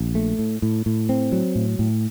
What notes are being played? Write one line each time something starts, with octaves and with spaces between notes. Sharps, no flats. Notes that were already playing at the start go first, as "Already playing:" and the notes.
Already playing: A#1
A3
A2
A2
A2
C4
F#3
A2
A2